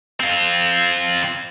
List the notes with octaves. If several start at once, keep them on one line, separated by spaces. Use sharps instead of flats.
C4 F4